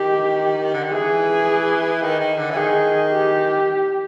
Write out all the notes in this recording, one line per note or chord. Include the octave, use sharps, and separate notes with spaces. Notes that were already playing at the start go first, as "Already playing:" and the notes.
Already playing: D#3 G4
D3
D#3
E3 G#4
D#3
D#3
D3
E3
D#3 G#4
G4